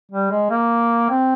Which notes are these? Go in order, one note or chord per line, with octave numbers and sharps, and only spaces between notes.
G3
G#3
A#3
C4